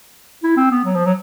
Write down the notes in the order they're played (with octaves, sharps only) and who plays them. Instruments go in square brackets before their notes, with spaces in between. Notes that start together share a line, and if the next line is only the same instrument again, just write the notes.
[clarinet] E4
C4
B3
F#3
F3
F#3